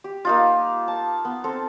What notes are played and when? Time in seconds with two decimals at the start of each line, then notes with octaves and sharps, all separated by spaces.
0.04 G4
0.25 A#3 D#4 F4
0.88 A5
1.25 B3
1.44 C4 A4